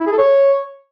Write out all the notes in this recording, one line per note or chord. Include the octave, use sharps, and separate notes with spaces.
E4
G#4
A4
C#5